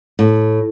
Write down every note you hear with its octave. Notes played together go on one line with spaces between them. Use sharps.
A2